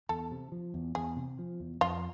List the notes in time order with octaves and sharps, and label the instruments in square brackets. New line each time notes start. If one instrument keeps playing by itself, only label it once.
[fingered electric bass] E2 [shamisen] A4
[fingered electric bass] C3
F3
E2
[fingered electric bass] E2 [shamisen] G#4
[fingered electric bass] C3
F3
E2
[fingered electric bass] F2 [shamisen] F4